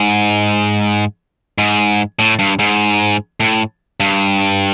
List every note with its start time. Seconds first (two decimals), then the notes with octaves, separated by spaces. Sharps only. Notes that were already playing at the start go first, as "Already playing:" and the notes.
Already playing: G#2
1.58 G#2
2.19 A2
2.39 G2
2.59 G#2
3.40 A2
4.00 G2